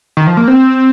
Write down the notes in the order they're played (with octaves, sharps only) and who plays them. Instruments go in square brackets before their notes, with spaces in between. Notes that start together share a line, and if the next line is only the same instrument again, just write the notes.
[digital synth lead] D#3
F3
A#3
C4